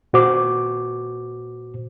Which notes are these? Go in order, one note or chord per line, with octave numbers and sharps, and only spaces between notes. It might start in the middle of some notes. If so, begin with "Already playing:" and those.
A#2 F#4 C5 D6